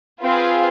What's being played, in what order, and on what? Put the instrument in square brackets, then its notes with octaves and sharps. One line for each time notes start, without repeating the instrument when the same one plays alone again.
[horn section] C4 [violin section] F4 G#4 B4 F5